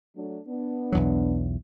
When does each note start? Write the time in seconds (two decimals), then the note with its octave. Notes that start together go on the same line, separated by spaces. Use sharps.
0.17 F#3 A3 D4
0.48 B3 D4
0.92 B1 E2 F#3